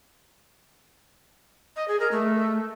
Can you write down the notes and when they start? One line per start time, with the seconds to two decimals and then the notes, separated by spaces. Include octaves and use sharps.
1.76 D#5
1.88 G#4
2.00 A#4
2.12 A3